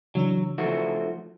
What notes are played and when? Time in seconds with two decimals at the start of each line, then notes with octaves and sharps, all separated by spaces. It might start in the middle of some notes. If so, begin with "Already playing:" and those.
0.15 C#3 E3 F#3 D4
0.58 F3 A3 F#4